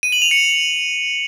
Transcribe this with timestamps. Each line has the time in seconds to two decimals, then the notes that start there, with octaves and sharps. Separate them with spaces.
0.03 D#7
0.12 F#7
0.22 F7
0.31 C#7